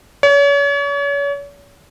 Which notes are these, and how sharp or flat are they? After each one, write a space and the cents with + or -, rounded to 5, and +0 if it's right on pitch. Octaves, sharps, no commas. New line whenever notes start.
C#5 +35